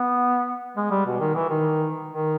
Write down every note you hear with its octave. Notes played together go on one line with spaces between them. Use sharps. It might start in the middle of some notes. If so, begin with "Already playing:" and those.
Already playing: B3
G#3
G3
B2
D#3
E3
D#3
D#3